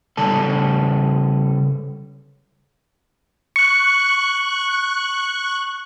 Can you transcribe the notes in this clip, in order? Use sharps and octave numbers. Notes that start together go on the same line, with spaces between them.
C#3 G3 A4 A5
C#6 F#6 C#7